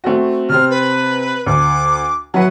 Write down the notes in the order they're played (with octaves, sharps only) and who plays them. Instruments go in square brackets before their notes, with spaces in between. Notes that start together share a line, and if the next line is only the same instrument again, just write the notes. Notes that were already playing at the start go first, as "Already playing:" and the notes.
[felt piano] A3 C4 F#4
[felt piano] C3 C4 [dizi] F6
[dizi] B4
[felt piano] D2 [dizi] D6
[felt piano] F#3 E4 B4 [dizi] F#5